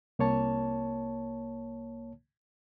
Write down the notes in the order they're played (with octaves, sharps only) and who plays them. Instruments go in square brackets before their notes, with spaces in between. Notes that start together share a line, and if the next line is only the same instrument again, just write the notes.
[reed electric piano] C2 A#3 C#5 A5